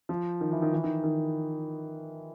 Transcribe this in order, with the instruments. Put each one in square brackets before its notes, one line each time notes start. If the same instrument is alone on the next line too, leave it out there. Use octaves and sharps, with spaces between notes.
[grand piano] F3
D#3
E3
D#3
E3
D#3
D#3